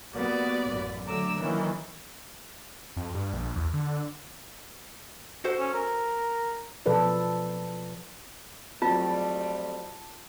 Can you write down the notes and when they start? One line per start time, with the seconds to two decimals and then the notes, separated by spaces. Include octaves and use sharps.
0.14 G3 A#3 B3 F#4 B4 D5
0.63 A1 F#2
1.06 D3 F#3 A3 A#5 D6 E6
1.40 D#3 E3 F#3 A#3 C#4
2.97 F2
3.15 G2
3.33 A#1
3.56 E2
3.74 D3
5.44 F#4 A4 C5
5.60 C#4
5.74 A#4
6.86 B2 F3 A4 B4 D5
8.82 F2 F#3 G3 A3 C4 F4 A5